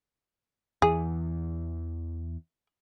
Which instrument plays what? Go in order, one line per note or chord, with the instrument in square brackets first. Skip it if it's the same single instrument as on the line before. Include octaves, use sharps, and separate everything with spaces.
[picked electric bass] E2 E3 [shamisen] G#4